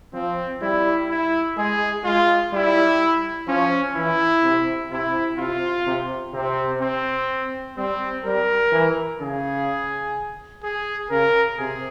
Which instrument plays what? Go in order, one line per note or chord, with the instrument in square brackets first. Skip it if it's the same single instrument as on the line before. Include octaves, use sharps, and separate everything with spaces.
[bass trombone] F3 [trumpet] C4
[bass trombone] G3 [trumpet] E4
[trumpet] E4
[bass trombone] G#3 [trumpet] G#4
[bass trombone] G#3 [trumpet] F4
[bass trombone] G3 [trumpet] E4
[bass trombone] F3 [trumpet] C#4
[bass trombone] E3 [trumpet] E4
[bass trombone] C3
[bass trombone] C3 [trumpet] E4
[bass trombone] C3 [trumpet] F4
[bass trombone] C3
[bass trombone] C3 [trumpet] C4
[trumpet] C4
[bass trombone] G3 [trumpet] C4
[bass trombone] G3 [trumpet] A#4
[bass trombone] E3
[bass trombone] C#3 [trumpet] G#4
[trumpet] G#4
[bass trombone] C#3 [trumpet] A#4
[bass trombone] C3 [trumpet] G#4